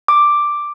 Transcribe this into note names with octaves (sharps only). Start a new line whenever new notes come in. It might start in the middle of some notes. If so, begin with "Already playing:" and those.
D6